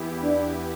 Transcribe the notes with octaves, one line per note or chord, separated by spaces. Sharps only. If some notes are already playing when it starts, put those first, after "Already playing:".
Already playing: E2 E3 B3 E4 G4
D4